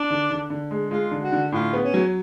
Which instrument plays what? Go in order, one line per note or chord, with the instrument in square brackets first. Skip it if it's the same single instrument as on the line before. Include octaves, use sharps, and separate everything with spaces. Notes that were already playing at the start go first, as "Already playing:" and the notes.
Already playing: [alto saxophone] D4
[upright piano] D3
D3
D3
G#3
[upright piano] G#3 [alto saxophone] F4
[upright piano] D3
[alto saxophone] F#4
[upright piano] D3
[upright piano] A2 [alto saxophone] F4
[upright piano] B3
[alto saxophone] C#4
[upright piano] F#3